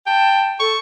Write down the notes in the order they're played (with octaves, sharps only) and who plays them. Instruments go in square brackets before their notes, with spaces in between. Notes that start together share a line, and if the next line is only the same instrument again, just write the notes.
[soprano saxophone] G5 [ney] A5
[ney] A4 [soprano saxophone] C#6